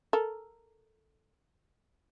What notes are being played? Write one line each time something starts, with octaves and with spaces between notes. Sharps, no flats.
A4 A#4